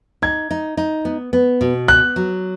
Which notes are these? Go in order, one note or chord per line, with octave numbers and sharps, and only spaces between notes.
D#4 G#6
D#4
D#4
B3
B3
B2
B3 F#6
F#3